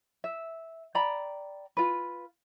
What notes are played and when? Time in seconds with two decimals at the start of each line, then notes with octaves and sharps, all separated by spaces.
0.24 E5
0.95 D5 G5 A#5 B5
1.77 F4 B4